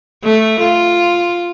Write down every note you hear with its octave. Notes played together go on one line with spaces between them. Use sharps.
A3
F4